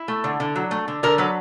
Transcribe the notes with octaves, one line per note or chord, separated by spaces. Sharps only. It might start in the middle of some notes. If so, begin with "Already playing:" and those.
Already playing: E4
A3
D3
D3
F#3
A3
D3
D3 A#4
F#3 B4